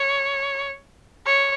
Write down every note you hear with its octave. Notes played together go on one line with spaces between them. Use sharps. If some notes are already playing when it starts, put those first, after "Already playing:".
Already playing: C#5
C#5